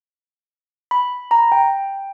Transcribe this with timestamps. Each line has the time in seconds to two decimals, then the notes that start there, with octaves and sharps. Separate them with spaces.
0.91 B5
1.31 A#5
1.52 G5